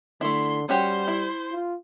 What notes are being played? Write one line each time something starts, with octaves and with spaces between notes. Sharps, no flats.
D3 A3 E4 C6
G3 C#4 F#4 G4 C5
E4
F4